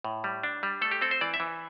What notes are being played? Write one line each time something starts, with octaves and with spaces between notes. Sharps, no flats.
A2
G3
D4
G3
A3 A4
G4
C4 A4
C5
E3 D5
E5
E3